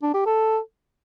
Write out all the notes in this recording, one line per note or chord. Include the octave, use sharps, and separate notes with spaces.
D4
G4
A4